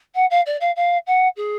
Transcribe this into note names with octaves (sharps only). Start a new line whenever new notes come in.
F#5
F5
D5
F5
F5
F#5
G#4